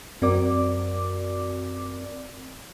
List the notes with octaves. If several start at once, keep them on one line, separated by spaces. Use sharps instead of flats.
F#2 C4 F#4 A#4 D5 D6